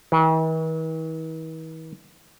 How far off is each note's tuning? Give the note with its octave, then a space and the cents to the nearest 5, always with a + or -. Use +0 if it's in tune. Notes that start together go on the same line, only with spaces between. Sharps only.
E3 -45